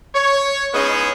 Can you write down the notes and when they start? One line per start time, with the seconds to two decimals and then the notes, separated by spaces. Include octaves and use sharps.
0.14 C#5
0.74 G#3 B3 C#4 D#4 E4 G#4